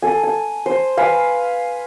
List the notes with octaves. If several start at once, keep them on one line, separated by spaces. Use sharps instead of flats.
A4 G#5
G#5
C5
B4 F5 G#5